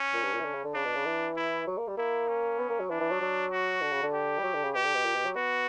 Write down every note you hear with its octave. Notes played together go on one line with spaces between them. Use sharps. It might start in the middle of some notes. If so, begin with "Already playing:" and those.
Already playing: C#4
A#2
G2
A#2
E3
D3
C#3
D3
C#3 D4
B2
C#3
E3
E4
F#3
A#3
G3
A#3 E4
C#4
B3
A#3
F#3
E3 D4
E3
F#3
F#3
F#4
D3
C#3
D3
G4
G3
F#3
D3
C#3
B2 G4
D3
B2
A#2
B2
F#3
B3 F#4